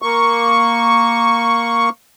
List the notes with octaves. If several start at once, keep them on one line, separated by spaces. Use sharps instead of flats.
A#3 C#6